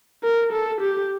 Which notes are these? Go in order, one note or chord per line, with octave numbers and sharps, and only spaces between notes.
A#4
A4
G4